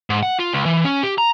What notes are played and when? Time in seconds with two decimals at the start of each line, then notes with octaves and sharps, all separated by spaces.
0.10 G#2
0.23 F#5
0.39 F4
0.53 C#2
0.65 E3
0.84 C#4
1.03 G4
1.18 A#5